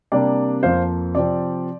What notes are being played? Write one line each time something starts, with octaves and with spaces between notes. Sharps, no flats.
C3 G3 A#3 D4 D5
F2 F3 A#3 C5 F5
C3 F3 C4 D5